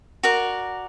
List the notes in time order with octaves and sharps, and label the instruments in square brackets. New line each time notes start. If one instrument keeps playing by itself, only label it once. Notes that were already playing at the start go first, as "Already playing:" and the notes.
[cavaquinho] F#4 A#4 D5